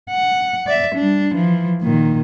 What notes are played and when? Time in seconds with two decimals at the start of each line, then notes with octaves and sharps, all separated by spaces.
0.11 F#5
0.66 D5 E5
0.95 G3 D4
1.35 E3 F3
1.82 A#2 D#3